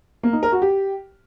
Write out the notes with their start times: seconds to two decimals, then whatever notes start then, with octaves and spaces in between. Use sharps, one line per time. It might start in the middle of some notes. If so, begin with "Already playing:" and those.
0.23 A#3
0.33 D#4
0.43 A#4
0.52 F#4
0.62 G4